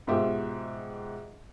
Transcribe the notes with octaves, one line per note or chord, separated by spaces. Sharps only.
G#2 B2 F4 G4 E5